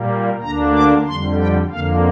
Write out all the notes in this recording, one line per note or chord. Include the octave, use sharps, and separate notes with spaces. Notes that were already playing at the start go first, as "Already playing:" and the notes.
Already playing: A#2 G3 A#3
D2 D3 A#3 D4 A#5
D6
F2 D3 G3 C6
G5
F2 D3 A#3 F5